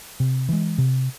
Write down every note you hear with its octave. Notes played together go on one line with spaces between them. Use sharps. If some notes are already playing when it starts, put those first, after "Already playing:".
C3
E3 G#3
C3